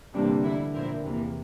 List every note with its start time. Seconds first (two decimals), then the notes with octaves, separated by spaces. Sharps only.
0.13 G2 C3 E3 G3 A#3 D4
0.29 D3
0.43 D3 E3 A3 E4
0.73 A#2 F3 C4 E4 A#4
1.03 E2 C3 E3 A#3